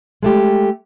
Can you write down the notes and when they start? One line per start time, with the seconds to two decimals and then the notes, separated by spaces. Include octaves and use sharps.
0.23 G#3 A3 G4